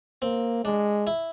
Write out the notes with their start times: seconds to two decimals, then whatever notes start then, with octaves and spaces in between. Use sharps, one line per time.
0.22 A#3 C4
0.64 G#3 D4
1.07 E4